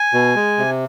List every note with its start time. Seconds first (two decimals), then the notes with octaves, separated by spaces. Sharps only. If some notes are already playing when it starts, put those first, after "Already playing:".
Already playing: G#5
0.14 B2
0.36 G#3
0.58 C3